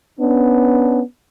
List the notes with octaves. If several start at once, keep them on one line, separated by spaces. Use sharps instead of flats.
B3 C#4 D4